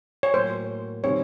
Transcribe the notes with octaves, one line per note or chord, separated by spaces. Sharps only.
C#5
A2 F#3 A#3 C5
C3 D#3 G3 C4 C#5